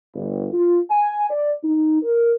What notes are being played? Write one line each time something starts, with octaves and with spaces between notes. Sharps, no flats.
G1
F4
G#5
D5
D#4
A#4